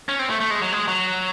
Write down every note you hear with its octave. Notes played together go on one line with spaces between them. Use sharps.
C#4
C4
A3
A3
G#3
F#3
G#3
F#3